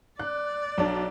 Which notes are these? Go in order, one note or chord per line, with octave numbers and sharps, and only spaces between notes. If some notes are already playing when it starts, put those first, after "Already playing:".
D5 F#6
B1 D4